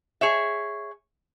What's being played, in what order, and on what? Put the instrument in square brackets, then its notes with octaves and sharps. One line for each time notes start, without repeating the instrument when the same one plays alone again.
[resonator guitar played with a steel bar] G#4 C#5 E5